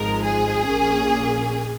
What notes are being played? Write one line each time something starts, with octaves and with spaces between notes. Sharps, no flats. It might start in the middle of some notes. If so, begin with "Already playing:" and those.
Already playing: G#1 G#2 F3 G#3 A#4
G#4
A#1 A#2 A#3 C#4